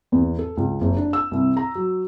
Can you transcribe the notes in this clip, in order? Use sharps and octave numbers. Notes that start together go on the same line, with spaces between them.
E2
A4
C#2
F#1
D4
E6
C2
A#5
F#3